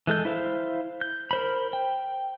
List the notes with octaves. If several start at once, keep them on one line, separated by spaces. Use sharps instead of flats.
E3 G#3 A4 G6
E4 C5 F5
G6
A#4 C5 B5
G5